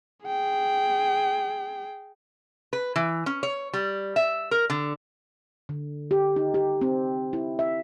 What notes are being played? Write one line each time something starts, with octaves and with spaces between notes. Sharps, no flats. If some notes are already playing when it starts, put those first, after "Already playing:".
G#4 G5
B4
E3
C#4
C#5
G3
E5
A#4
D3
D3
G4
D#4
G4
C4
E4
E5